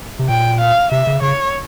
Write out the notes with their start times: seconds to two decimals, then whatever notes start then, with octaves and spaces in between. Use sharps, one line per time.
0.19 C3
0.29 A#2 G5
0.60 F5
0.91 C3 E5
1.07 C#3
1.22 C#3 C#5